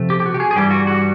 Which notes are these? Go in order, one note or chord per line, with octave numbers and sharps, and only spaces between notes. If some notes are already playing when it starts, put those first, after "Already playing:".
Already playing: C3 F3 A3
G4
G4
F#4
G4
G#4
G#4
G2 E3 G3 G4
F#4
F#4